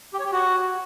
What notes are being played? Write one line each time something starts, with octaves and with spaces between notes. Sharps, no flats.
G4
C#5
G4
F#4